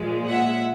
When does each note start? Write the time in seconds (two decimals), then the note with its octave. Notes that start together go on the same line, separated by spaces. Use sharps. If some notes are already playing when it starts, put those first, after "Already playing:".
Already playing: A#2 F3 G#3
0.29 E5 F#5